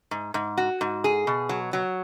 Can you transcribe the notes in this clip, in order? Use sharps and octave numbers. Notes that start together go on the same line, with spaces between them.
G#2
G#2
F#4
G#2
G#4
B2
F#3
F#3